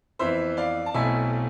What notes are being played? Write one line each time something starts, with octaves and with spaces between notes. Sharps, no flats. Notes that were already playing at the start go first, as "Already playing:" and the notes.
F2 E3 B3 E4 C5 E5
D5 F5
A5
B1 B2 A3 C4 E4 E5 G#5